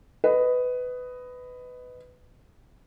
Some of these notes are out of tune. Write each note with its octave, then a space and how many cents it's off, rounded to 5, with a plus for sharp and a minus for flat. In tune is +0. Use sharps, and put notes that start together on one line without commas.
B4 +15 D#5 +0